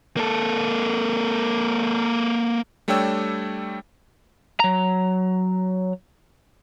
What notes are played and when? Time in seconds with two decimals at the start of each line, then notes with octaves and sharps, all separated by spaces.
0.17 A#3 A4
2.88 G3 A3 D4 C#5 G5 E6
4.60 F#3 A#5